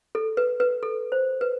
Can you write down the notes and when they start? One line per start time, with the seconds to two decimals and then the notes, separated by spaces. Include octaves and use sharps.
0.15 A4
0.37 B4
0.60 B4
0.83 A4
1.12 C5
1.41 B4